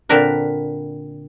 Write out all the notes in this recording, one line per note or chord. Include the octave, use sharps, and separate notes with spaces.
A#2 D3 C4 D4 A#4 B4